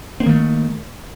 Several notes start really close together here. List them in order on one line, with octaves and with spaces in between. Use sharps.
C4 A#3 D#3 A3